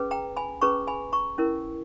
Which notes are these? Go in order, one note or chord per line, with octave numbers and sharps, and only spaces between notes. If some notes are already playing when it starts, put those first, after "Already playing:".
Already playing: C#4 G#4 B4
G5 A#5
G#5 B5
C#4 G#4 B4 A#5 C#6
G#5 B5
A#5 C#6
C#4 E4 A#4